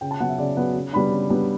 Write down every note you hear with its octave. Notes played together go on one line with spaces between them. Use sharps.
C#3 G5
A5
F#3 B3 F#5
E5
C#3 D5
F#3 B3 F#5
C#3
G3 B3 D4 B5
C#3
G3 B3 D4